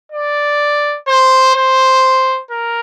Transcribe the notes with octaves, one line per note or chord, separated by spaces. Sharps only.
D5
C5
C5
A#4